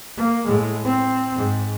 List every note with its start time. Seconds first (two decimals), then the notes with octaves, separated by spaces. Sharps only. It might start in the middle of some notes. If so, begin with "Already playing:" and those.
0.17 A#3
0.47 A2 G#3
0.84 C4
1.36 G#2